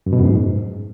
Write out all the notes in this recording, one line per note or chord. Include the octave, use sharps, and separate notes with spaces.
F#2
B2
F#2
G#2